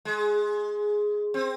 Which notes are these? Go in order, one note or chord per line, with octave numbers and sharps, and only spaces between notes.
G#3
C4